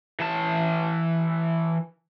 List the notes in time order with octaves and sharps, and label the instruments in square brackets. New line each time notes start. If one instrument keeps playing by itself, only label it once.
[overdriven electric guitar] E3 A5